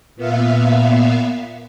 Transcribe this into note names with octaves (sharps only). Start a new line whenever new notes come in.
A#2 B3 E5 F5